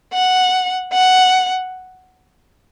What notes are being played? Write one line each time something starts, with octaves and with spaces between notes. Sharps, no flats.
F#5
F#5